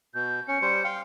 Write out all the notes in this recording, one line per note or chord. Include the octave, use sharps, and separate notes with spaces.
B2 G6
C#4 C#7
G3 C5
F5 G5